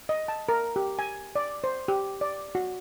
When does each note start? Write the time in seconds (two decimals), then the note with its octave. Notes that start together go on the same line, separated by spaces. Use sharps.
0.09 D#5
0.28 A5
0.49 A#4
0.76 G4
0.99 G#5
1.36 D5
1.64 C5
1.88 G4
2.21 D5
2.55 F#4